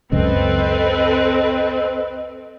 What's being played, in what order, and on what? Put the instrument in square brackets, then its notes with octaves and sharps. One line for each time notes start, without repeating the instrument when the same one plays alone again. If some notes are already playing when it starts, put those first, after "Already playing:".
[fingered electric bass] C#2 F#2 C#3 [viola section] C4 A4 B4 [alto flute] D#5